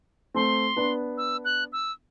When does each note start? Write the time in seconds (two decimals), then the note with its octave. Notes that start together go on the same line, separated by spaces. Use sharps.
0.34 A3 C4 C6
0.76 B3 D4
1.18 E6
1.45 F#6
1.73 E6